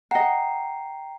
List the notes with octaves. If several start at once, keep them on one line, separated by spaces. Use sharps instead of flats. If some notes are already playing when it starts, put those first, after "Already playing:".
D#5 F#5 G5 A#5 C7